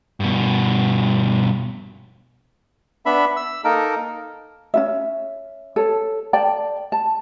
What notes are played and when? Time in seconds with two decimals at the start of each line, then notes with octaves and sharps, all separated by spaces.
0.20 G2 B2
3.06 B3 D4 E5 B5
3.36 E6
3.64 A#3 D#4 A4 A#4
4.74 C#4 F4 E5
5.76 A4 C#5
6.33 D5 G5 A5
6.92 A5